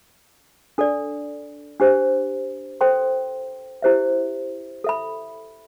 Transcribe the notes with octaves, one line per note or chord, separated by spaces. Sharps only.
D4 A4 D5
D4 G4 C5
A4 C5 G5 C6
E4 G4 C5 E5
A4 E5 B5